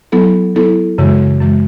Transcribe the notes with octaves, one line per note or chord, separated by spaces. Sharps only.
F#3 B3 E4 A4
F#3 B3 E4 A4
F#2 C#3 E3 G#3
F#2 C#3 E3 G#3